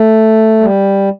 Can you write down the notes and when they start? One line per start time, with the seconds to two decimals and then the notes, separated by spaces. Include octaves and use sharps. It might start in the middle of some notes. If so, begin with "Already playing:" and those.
Already playing: A3
0.60 G3